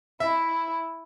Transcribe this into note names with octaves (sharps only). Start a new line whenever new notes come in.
E4 E5